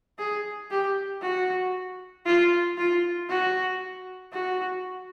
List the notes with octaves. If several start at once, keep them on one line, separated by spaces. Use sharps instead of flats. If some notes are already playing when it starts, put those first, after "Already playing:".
G#4
G4
F#4
F4
F4
F#4
F#4